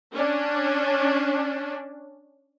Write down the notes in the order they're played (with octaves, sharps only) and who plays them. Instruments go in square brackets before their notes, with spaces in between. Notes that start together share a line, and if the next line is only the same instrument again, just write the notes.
[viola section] C#4 D4